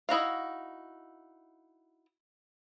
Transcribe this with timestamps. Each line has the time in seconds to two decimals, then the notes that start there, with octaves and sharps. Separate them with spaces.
0.09 D#4 E4 F#4 F5